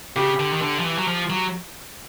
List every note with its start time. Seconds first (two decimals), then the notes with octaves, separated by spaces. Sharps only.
0.16 C#3 G4
0.40 D3
0.53 D#3
0.62 D3
0.79 F3
0.85 E3
0.98 F#3
1.08 F3
1.30 F#3